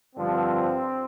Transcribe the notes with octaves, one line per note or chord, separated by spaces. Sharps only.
G2 D3 F3 C4